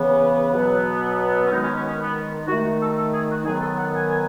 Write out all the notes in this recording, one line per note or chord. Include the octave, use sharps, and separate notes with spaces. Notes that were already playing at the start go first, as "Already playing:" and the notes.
Already playing: C#3 E3 B3
B2 F#3 B3
C#4
D#3 G#3 B3 D#4
C#4
C#4
C#4
B3
D#3 A3 F#4
A4
A4
G#4
F#4
D#3 F#3 B3 G#4
A4
F#5
G#5
G#5